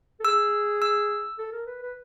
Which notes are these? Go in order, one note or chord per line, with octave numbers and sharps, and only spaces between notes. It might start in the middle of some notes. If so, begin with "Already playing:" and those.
A4
G#4 E6
E6
A4
A#4
B4
B4